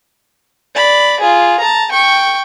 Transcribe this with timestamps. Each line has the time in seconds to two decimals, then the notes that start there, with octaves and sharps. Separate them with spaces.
0.75 D5 B5
1.20 F4 G#4
1.60 A5 A#5
1.92 G5 C#6